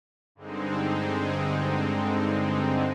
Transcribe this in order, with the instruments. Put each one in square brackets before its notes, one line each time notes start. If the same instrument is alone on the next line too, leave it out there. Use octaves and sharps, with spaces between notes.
[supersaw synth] G2 D3 G#3 C4 D#4